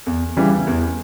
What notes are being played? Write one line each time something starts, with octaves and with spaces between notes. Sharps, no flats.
E2
C#3 E3 G3
E2